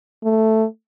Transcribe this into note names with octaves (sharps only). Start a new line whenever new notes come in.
A3